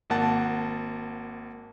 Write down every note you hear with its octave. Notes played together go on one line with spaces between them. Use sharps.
G#1 A#3 F#5 A5 A6